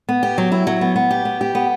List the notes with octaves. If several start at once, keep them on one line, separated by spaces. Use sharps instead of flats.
B3
G4
F#3
E4
F#3
B3
B3
G4
B3
G4
B3